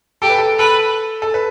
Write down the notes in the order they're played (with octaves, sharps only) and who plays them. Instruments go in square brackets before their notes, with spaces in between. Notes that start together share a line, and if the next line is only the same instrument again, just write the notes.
[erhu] G4 [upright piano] A4
[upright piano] B4
A4
[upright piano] A4 [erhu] B4
[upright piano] A4
B4